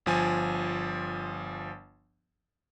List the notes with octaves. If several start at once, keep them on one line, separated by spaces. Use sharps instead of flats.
G1 F3 G#5